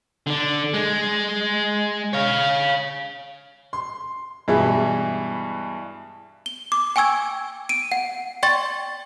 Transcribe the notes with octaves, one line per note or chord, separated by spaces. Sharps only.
D3 D4
G#3
C#5 F5
C6
G2 B2 E3 G#3 E4
G7
D6
G5 G#5 C#6 E6 G#6
D7 D#7
F#5
D5 G5 C6 C#6 A6